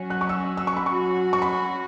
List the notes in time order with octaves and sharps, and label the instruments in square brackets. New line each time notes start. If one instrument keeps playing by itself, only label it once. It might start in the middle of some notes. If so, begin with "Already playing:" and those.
Already playing: [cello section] F#3 C#4 F#4
[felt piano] F#6
C#6
E6
E6
C#6
B5
[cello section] F#3 C#4 F#4 [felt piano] C#6
[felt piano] C#6
B5